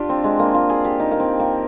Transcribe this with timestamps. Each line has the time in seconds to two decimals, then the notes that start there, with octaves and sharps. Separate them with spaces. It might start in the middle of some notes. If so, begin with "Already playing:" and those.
Already playing: D4 F4 G4
0.09 C4
0.24 G#3
0.39 A#3
0.54 F4
0.69 G#4
0.84 G4
1.00 D#4
1.11 A#3
1.20 C4
1.40 A#3